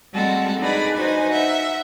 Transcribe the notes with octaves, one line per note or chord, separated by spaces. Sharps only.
G3 G#3 C4 F#4 A4
D4 D#4 G#4 B4 D5 B5
D#4 F#4 B4 C5 G#5
E5 F#5